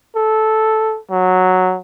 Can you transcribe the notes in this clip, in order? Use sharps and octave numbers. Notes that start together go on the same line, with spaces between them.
A4
F#3